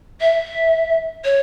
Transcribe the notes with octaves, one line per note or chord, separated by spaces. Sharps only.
E5
C#5